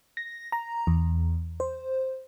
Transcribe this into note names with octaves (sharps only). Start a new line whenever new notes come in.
A#6
A#5
E2
C5